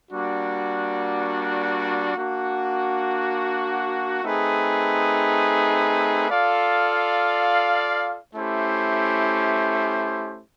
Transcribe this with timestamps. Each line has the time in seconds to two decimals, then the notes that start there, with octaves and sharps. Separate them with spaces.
0.11 G3 A#3 D4 F#4
2.16 A#3 D4 F#4
4.23 A3 C4 D#4 G#4 B4
6.29 F4 A4 D5 F5
8.35 A3 C#4 E4 G4 C5